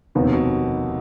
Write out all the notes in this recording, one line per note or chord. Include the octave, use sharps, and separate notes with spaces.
F1 D#2 B2 D#3 B3 D#4
C3
B2